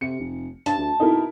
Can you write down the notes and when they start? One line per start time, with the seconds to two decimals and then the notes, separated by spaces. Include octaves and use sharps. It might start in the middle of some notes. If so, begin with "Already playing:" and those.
0.01 C3 C#7
0.20 F1
0.66 G2 A5
0.77 D2
1.00 B2 D#4 E4 A#4